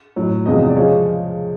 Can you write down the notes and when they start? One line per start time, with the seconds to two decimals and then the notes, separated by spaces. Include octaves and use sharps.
0.16 A2 F#3
0.46 E2 C3 F3 G#3 D#5
0.68 D5
0.76 C#3 F3 G#3 C#5